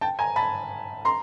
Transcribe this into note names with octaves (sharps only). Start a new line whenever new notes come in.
G5 A5
G#5 A#5
A5 B5
A#5 C6